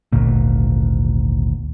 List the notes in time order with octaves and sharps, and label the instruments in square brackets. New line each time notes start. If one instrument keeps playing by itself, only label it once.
[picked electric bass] G#1 D2 A#2